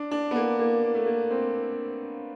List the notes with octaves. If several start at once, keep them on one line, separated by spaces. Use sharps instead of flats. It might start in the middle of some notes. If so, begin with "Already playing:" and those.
Already playing: D4
D4
B3
A#3
A#3
A#3
A3
A#3
C4